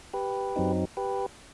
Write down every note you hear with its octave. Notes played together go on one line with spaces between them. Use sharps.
G4 B4
F#2 F#3 C4 D#4
G4 B4